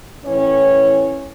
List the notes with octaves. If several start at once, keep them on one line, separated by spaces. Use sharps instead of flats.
A2 E3 C#4 C#5